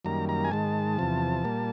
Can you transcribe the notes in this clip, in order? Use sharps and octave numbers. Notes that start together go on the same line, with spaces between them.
F#2 D#3 G3 A#3 A#5
A#5
G#5
G#2 D#3 G#3 A5
E2 C3 F3
A#2 G3 A#3